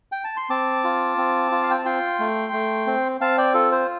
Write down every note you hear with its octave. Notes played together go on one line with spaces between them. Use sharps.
G5
A5
C6
C4 A5 D6
F4
C4
F4
F5
G5
A5
F4 G5 C6
A3
A3
C4
C4 F5 A5
D5 G5
F4 A4
C5